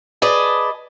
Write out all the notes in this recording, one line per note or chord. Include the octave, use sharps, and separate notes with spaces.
G#4 B4 D5 D#5 A5